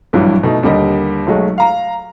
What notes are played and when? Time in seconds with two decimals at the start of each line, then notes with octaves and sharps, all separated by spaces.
0.13 A#1 G2 E3 F#3 G3
0.43 B2 A3 D#4
0.63 D#2 D3 G3 A#4 D#5
1.27 B1 F#3 G#3 A3
1.58 F5 A#5